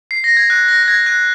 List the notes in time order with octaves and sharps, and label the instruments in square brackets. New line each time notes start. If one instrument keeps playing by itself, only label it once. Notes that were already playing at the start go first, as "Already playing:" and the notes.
[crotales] C7
A#6
G#6
F#6
A#6
A#6
G#6
F#6